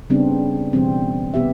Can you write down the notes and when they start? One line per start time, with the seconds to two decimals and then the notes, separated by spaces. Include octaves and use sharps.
0.10 C#3 G3 B3 C4 D4
0.73 B2 E3 G3 C4
1.34 C3 B3 G4 E5